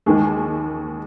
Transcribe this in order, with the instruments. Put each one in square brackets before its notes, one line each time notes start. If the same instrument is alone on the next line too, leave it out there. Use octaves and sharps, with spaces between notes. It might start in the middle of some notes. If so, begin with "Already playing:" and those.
[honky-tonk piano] D#2 D#3 G#3 G#4